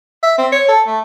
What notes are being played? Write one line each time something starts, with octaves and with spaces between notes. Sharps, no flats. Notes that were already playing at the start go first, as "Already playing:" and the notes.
E5
C4
C#5
A4
A3